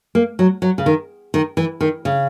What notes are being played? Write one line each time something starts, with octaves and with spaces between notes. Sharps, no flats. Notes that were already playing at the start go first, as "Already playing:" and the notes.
A#3
F#3
F#3
C#3
D#3
D#3
E3
D#3
C#3